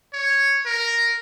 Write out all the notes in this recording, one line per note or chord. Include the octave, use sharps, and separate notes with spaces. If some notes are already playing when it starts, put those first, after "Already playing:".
C#5
A#4